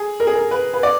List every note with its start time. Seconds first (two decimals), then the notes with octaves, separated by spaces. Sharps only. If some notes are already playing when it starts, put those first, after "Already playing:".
Already playing: G#4
0.20 A#4
0.27 G#4
0.35 A#4
0.51 B4
0.74 B4
0.83 D5